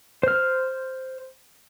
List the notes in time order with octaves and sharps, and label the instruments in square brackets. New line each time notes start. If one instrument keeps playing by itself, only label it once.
[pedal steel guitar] C5 F6